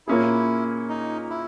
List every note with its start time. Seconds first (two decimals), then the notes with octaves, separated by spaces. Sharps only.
0.07 A#2 A#3 C#4 E4 G#4
0.89 D#4
1.30 E4